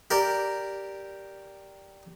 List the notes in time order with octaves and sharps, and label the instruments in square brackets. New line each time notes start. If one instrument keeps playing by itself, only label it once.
[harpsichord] G4 A#4 D5